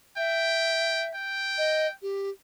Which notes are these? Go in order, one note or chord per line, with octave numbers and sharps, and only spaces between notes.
E5 G5
G5
D#5
G4